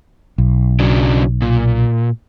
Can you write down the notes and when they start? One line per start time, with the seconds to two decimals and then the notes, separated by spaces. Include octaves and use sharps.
0.38 B1
0.80 C#3 F#3 D4
1.42 A#2